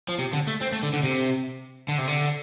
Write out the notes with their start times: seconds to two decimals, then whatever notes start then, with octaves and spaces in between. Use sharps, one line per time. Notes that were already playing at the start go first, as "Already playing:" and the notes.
0.08 F3
0.19 C3
0.33 D3
0.47 A3
0.61 C4
0.72 A3
0.83 D3
0.93 D3
1.03 C3
1.88 D3
1.98 C3
2.07 D3